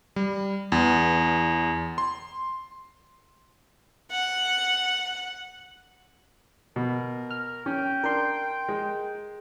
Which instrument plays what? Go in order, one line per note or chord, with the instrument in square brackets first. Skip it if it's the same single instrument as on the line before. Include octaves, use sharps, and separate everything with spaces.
[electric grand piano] G3
E2
C6
[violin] F#5
[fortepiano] B2 [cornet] A#4
[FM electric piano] F6
[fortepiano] C#4 [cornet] G5
[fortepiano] D4 [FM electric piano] A#4 C6
[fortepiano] G#3